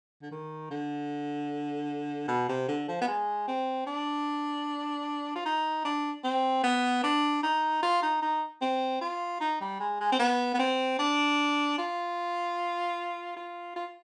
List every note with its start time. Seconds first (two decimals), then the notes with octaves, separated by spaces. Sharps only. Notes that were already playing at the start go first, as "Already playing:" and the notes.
0.22 D3
0.31 D#3
0.71 D3
2.28 B2
2.49 C3
2.68 D3
2.88 F3
3.01 B3
3.07 G#3
3.47 C4
3.86 D4
5.35 F4
5.45 D#4
5.85 D4
6.24 C4
6.64 B3
7.03 D4
7.43 D#4
7.82 F4
8.02 D#4
8.22 D#4
8.61 C4
9.01 F4
9.40 D#4
9.61 G3
9.80 G#3
10.00 G#3
10.12 C4
10.19 B3
10.54 B3
10.59 C4
10.99 D4
11.78 F4
13.36 F4
13.76 F4